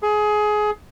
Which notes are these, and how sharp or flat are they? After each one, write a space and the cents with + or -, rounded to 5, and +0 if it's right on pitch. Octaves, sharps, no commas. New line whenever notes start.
G#4 +20